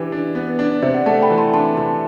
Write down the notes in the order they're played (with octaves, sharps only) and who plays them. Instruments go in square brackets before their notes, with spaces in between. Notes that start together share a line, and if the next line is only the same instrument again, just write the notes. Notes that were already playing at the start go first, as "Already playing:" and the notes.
Already playing: [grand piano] E3 D4 G4
D4
B3
[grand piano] D4 [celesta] D5
[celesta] D5
[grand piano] C3 [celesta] C5 E5
[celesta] D5 F#5
[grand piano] A3 [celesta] F#5 A5
[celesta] G5 B5
[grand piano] E3
[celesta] A5 C6
[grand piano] D4 [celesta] A5 C6
[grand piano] C3 [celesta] A5 C6